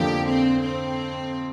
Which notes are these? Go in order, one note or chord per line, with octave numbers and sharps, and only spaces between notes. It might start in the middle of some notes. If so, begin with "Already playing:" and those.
Already playing: F2 D3 F3 A#3 G4
C4
C4